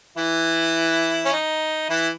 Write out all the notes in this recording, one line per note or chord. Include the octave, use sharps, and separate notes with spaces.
E3 E4
C#4
D#4
E3 E4